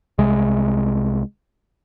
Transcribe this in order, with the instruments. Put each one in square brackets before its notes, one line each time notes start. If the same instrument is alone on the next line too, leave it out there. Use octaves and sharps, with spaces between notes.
[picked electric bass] C2 C3 G#3